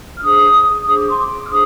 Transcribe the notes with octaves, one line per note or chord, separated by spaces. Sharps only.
F6
D4 G#4 C5 D#6
D4 G#4 C5 D#6
D6
C6
D6
F6
D4 G#4 C5 D#6